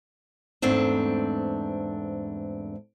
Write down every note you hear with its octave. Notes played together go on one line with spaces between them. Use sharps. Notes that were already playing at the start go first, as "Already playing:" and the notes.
E2 G#2 A3 C4 D4